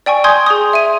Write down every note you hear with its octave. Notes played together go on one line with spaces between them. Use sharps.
D5 G5 G#5 C#6
G#5 C6 D#6 G6 G#6
G#4 C6 D#6
E5 D#7